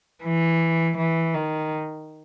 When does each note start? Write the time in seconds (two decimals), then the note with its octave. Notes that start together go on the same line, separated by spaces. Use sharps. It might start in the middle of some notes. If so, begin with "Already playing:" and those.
0.24 E3
0.98 E3
1.34 D#3